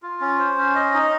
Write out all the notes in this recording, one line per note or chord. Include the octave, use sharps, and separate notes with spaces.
F4
C#4
C5
C#4
D#5
D#4